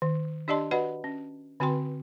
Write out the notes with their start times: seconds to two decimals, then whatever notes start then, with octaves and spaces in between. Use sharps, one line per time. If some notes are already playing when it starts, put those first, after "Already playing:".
0.02 D#3
0.48 D4 G4 D5 D#5 A5 C6
0.71 F#4 B4 D5 D#5 F#5 B5
1.04 C#4
1.60 D3 C4 F#4 B4 G5 C6